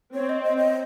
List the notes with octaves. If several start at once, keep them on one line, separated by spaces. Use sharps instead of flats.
C4 C#5
D#5
D#5
D#5